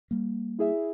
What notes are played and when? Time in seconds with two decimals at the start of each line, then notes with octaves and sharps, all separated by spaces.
0.11 G3 A#3
0.59 E4 G#4 E5